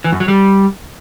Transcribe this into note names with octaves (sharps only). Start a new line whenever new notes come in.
E3
F#2
F#3
G3